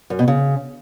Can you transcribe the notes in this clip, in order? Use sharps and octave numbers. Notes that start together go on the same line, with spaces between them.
F#2
B2
C#3